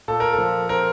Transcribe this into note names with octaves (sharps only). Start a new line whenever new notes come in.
A#2 A4
A#4
A4
F3
C4 A#4